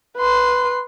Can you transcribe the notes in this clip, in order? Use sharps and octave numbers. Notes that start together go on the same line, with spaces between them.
B4 C6